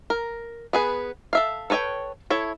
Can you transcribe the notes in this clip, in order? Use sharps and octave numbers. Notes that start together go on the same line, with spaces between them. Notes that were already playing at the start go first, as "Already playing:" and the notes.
A#4
B3 G#4 B4
A4 E5 F5
A4 B4 C#5 D#5 G5
E4 A4 C#5